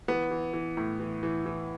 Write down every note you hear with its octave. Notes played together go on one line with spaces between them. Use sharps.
E3 B3
E3
E3
A2
E3
E3
E3